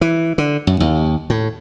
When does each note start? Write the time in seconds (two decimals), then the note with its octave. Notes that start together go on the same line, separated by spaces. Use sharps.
0.01 E3
0.38 D3
0.67 F#2
0.80 D#2
1.30 A2